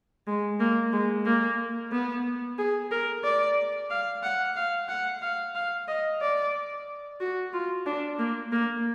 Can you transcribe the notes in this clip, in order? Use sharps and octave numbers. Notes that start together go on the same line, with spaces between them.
G#3
A#3
G#3
A#3
B3
G#4
A#4
D5
F5
F#5
F5
F#5
F5
F5
D#5
D5
F#4
F4
D4
A#3
A#3